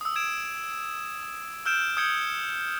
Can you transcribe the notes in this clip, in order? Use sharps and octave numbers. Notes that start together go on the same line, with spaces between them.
D#6 E6
E6 G#6 D7 E7
E6 F6 G6 D7 E7
D#6 G6 G#6 C#7 G7